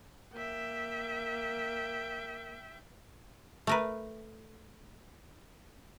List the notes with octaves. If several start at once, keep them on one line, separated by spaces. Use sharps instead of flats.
A#3 E5 G5
A3 A#4 B4